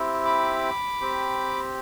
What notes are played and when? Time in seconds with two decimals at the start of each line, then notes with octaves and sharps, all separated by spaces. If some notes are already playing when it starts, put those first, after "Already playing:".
Already playing: C4 E4 G4
0.25 B5 D6
1.01 C4 G4